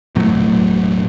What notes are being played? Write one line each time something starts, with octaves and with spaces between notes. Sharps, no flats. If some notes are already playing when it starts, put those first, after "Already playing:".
E1 A2 F#3 A3